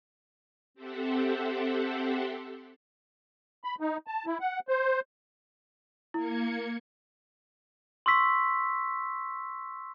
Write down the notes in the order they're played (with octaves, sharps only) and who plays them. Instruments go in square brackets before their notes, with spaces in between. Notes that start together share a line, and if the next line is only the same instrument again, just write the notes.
[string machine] C4 G4 A4 C5 E5 F#5
[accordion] B5
D#4
A5
E4
F#5
C5
[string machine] A#3 G#6 C#7 [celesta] E4
[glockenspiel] C6 C#6 E6 B6